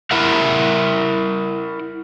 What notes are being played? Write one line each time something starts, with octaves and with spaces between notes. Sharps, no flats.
E4 A#4 E5 F#5